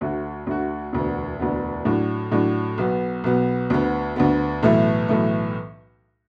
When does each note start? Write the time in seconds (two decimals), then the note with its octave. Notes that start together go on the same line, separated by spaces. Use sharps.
0.01 D2 D3 A3 F#4
0.47 D2 D3 A3 F#4
0.93 E1 D2 D3 B3
1.39 E1 D2 D3 B3
1.85 A2 F#3 D4
2.31 A2 F#3 D4
2.78 B1 B2 B3
3.24 B1 B2 B3
3.70 D2 D3 B3
4.16 D2 D3 B3
4.63 B1 A2 E3 A3
5.08 B1 A2 E3 A3